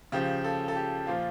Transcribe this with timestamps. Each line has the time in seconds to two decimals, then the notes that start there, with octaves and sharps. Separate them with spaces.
0.12 C#3 F3 G4
0.44 A4
0.68 A4
0.75 G4
1.07 A#2 F3 F4